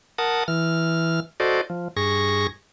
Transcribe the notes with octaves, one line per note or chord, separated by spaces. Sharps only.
A#4 F#5 A5 D#6
E3 F6
F#4 A4 C5 D5 D#5
F3
G2 G#4 C#6 A#6